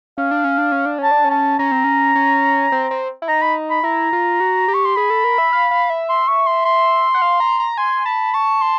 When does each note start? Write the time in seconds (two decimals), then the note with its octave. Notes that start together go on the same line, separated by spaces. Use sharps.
0.18 C#4 F5
0.31 D4
0.44 C#4
0.58 D4
0.72 C#4
0.86 D4
0.99 C#4 A5
1.11 D4
1.24 C#4
1.31 A5
1.59 C#4 A#5
1.72 C4
1.84 C#4
2.15 C#4
2.72 C4
2.91 C4
3.22 E4
3.28 D#4 A#5
3.42 B5
3.70 B5
3.84 E4 A#5
4.13 F4
4.40 F#4
4.68 G4
4.74 C#6
4.85 C6
4.96 G#4 B5
5.10 A4
5.24 A#4
5.38 E5
5.53 F5
5.71 F5
5.90 E5
6.09 C6
6.28 C#6
6.47 C6
6.65 C6
7.14 F#5
7.22 F5
7.40 A#5
7.60 A#5
7.78 G#5 C6
8.06 A5 B5
8.34 A5 C#6
8.62 C6